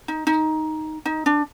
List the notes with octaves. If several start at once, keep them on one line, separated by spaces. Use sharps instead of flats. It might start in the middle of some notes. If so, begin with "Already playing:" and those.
D#4
D#4
D#4
D4